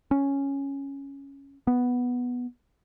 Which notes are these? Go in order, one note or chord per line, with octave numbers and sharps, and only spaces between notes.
C#4
B3